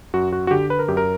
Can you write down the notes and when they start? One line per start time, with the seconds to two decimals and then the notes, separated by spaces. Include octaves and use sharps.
0.14 F#2 F#4
0.32 F#4
0.47 F#4
0.51 D3 G4
0.70 B4
0.79 A#4
0.88 F#2 G4
0.97 A#4